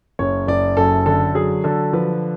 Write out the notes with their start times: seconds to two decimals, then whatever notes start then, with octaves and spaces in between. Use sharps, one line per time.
0.19 F#1 C#5
0.47 F#1 D5
0.77 F#2 A4
1.06 D3 A4
1.35 F#3 G#4
1.64 D3 A4
1.93 F3 B4